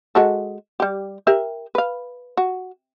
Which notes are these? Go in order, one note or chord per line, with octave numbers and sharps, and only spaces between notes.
G#3 F#4 A4
G3 G4
G4 A#4 E5
B4 F5
F#4